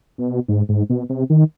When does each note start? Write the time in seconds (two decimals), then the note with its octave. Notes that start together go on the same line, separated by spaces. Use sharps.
0.18 B2
0.48 G#2
0.69 G#2
0.90 B2
1.10 C3
1.30 D#3